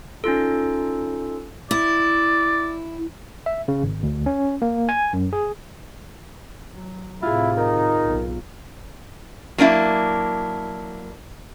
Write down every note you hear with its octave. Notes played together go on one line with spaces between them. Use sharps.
C#4 D#4 F4 A4
E4 D5
E5
C#3
G#1
D2
C#4
A#3
G#5
F#2
G#4
F#3
A2 C3 E4 F4 G#4
D#3 D#4
B1
F#3 A#3 D4 E4